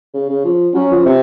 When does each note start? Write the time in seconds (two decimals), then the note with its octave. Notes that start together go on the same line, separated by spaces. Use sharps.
0.14 C#3
0.29 C#3
0.45 F3
0.74 F#3 C#4
0.91 F3
1.06 C3